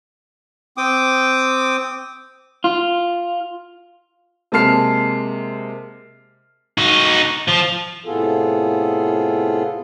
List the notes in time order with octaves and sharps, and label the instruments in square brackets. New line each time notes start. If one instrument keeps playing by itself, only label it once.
[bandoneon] C4 G5 D6 D#6
[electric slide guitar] F4
[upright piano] C3 G#3 A#3 A5 F6 C7
[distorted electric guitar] D#4 F#4
F3
[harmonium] A2 C3 B3 F4 G#4 A4